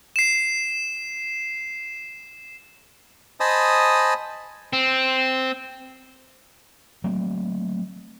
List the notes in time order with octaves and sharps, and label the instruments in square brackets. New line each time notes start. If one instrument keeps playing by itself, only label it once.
[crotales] C7 E7
[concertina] C5 D#5 G#5 A5 B5 D#6
[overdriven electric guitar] C4
[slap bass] F#3 A3 A#3 C4